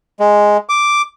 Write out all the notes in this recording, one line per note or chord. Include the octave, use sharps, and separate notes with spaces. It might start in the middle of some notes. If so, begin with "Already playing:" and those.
G#3
D6